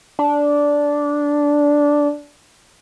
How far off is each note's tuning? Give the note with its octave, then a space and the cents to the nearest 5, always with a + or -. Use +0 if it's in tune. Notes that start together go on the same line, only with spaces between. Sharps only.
D4 -10